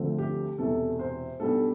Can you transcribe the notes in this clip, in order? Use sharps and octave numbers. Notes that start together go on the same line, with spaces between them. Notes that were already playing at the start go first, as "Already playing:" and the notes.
Already playing: D2 D3 F3 A3 C4
G4
E1 E2 C3 A4
C5
B1 B2 G3 D4 A4